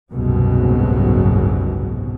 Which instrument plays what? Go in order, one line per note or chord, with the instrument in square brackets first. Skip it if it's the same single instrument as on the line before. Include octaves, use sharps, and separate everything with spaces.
[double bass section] F#1 C2 G#2 B2 F#3